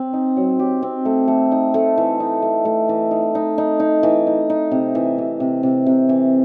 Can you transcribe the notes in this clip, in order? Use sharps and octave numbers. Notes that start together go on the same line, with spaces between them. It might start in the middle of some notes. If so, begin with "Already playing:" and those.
Already playing: C4
D#4
F#3
G4
C4
A3
A3
D#4
A3
E3
D#4
A3
A3
E3
D#4
D#4
D#4
D#4
E3
D#4
D#4
C3
E3
C3
C3
C3
C3
E3